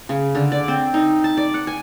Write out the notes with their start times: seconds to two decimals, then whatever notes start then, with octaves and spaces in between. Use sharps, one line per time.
0.09 C#3
0.35 D3
0.52 D5
0.68 C4
0.94 D#4
1.24 A5
1.37 D5
1.54 F#5
1.67 G#5